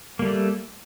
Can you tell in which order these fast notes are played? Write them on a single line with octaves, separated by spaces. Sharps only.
A#3 G3 A3